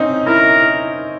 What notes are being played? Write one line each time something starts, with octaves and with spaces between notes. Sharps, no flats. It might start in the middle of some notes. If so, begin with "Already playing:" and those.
Already playing: C4 C#4 D#4
E4 A#4